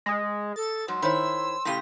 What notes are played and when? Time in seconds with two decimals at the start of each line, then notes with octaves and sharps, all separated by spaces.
0.06 G#3 D#6 A#6
0.56 A4 A6
0.88 G#2 F#3 C6
1.02 D#3 E4 C5 C#5 B5 E6
1.65 A2 C#3 G4 A#6